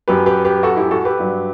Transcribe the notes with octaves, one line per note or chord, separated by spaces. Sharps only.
F#2 F#3 G4 B4
G4 B4
G4 B4
F#4 A4
E4 G4
F#4 A4
G4 B4
G2 F#3